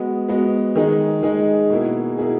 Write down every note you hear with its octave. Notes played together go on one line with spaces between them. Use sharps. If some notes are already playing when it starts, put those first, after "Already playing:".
Already playing: G#3 B3 F#4
G#3 B3 F#4
D#3 G#3 D#4 G#4
D#3 G#3 D#4 G#4
B2 A#3 E4 G#4
B2 A#3 E4 G#4